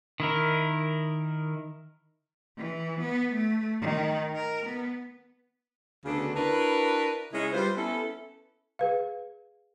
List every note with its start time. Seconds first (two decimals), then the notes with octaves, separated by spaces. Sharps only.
0.20 D#3 E4 A#4
2.57 E3
3.00 B3
3.33 A3
3.81 D#3
4.35 A#4
4.66 B3
6.05 D2 C#3 B3 D4 F#4 A4
6.35 D4 E4 F#4 A#4 B4
7.32 C#3 G#3 C#4 D#4 E4 G#4
7.53 G3 F4 B4 C5
7.76 B3 C#4 E4 A4
8.79 G#4 B4 F5